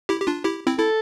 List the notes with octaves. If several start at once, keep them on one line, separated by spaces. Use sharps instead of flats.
E4 G4
G4
D4 F4
E4 G4
C4 E4
E4 A4